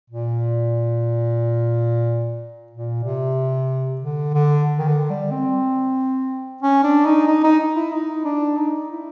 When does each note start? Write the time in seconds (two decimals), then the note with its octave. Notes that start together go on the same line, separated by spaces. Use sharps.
0.10 A#2
2.71 A#2
3.04 C3
4.01 D3
4.34 D3
4.78 D#3
4.88 D3
5.10 G3
5.31 C4
6.62 C#4
6.83 D4
7.06 D#4
7.27 D#4
7.44 D#4
7.76 E4
7.92 D#4
8.25 D4
8.57 D#4
8.91 E4